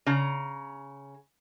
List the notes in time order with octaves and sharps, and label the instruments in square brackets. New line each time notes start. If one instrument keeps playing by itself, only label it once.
[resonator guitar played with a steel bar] C#3 A#5